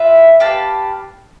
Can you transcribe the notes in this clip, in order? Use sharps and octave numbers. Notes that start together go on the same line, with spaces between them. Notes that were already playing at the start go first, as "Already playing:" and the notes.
Already playing: F4 B4 E5
G4 B4 F5 A5